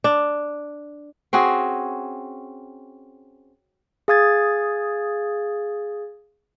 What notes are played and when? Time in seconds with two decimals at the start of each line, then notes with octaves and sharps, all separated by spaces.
0.04 D4
1.33 C4 C#4 F#4 G#4
4.08 G#4 F5 D#6 G#6 A6